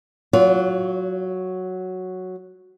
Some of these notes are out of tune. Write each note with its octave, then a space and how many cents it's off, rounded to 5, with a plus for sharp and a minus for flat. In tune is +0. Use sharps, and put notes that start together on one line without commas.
F#3 +0 F4 -5 C#5 +35